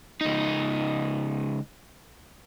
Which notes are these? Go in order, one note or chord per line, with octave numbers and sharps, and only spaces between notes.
C#2 D#4